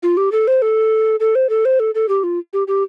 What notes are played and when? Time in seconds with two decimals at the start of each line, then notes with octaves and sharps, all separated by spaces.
0.03 F4
0.17 G4
0.32 A4
0.47 C5
0.62 A4
1.20 A4
1.35 C5
1.49 A4
1.65 C5
1.80 A4
1.95 A4
2.09 G4
2.23 F4
2.53 G4
2.68 G4